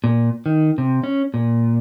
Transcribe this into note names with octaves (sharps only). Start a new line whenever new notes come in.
A#2
D#3
C3
C#4
A#2